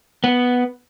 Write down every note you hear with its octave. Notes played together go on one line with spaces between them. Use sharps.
B3